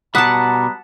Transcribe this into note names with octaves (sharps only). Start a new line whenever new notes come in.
B2 G3 F#5 A5 A#5 D#6 F#6 B6